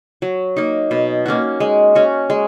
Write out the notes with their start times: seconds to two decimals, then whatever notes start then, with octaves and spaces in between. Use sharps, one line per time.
0.22 F#3
0.57 A#3 D#4
0.91 B2
1.26 A#3 C#4 F#4
1.60 G#3
1.95 C#4 F#4
2.30 G#3